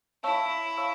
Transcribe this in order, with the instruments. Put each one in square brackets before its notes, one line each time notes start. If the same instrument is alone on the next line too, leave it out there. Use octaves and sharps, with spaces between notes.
[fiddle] E4 [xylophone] C#5 F5 A5 C#6 E6
[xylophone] C#5 F5 A5 C#6 E6